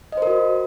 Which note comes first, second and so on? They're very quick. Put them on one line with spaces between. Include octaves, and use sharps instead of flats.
D#5 C5 A#4 F#4